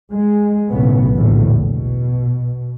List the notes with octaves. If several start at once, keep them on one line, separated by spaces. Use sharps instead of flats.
G#3
B1 A2 C#3 B3
A#1 E2 A2 D3
B2